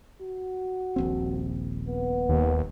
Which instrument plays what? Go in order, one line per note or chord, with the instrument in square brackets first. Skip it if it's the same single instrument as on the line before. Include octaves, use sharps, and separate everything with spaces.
[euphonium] F#4
[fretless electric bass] D#1 A#1 C4
[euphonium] B3
[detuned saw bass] D#2